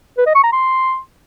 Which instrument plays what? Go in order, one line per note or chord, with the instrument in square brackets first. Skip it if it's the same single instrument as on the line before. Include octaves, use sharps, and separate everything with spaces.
[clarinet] B4
D#5
C#6
A#5
C6